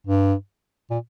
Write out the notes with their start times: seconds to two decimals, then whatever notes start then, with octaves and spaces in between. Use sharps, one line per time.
0.07 G2
0.90 A#2